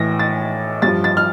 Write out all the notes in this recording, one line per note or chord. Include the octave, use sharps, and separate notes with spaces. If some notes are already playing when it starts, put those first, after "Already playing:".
Already playing: A2 E3 A#6
A6
G2 F3 A6
A6
F6